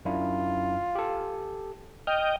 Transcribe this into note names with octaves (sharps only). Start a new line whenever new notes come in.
F#2 D4 E4 F4
G4 A4
D#5 G5 F6